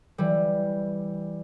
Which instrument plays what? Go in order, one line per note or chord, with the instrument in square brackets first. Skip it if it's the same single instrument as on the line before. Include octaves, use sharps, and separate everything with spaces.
[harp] E3 G3